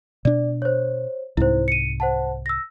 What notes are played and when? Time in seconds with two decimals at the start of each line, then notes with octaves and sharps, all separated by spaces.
0.25 B2 D4 D5
0.62 C5 C#5
1.37 C2 G#2 E4 C5
1.68 C#7 D#7
2.00 C5 F#5 A5
2.46 E6 A#6